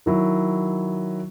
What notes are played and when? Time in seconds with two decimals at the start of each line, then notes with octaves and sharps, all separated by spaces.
0.06 D#3 F#3 E4